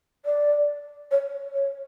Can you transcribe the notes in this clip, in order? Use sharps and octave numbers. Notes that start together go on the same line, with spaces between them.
D5
C#5
C#5